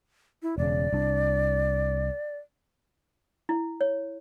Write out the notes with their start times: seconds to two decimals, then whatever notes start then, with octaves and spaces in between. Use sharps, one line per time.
0.43 E4
0.58 E1 C#3 D5
0.93 C2 D4
3.49 E4
3.81 C#5